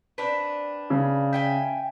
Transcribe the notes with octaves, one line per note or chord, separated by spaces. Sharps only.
C4 D4 B4
C#3
E5 G5 G#5